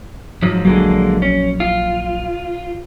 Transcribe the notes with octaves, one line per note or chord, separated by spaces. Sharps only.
G#2 F3 F#3
A#1 D3 F#3 G#3 A#3
C#4
F4